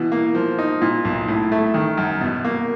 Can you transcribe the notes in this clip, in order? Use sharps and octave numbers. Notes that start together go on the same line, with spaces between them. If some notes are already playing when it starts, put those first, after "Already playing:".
Already playing: B2 E3
A#3
F3
D#4
A#2
B1
A2
A3
D#3
F#2
B2
A#3